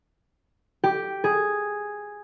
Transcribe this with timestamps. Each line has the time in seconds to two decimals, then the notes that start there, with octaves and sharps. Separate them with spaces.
0.84 G4
1.24 G#4